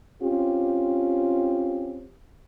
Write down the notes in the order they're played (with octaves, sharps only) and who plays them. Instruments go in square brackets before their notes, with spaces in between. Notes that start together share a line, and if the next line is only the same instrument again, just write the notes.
[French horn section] C4 C#4 F4 G4